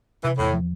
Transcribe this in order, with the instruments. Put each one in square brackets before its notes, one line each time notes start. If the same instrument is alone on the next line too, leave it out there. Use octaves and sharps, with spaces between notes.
[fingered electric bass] C3 [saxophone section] E3
[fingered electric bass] E2 [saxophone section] A2
[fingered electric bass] F3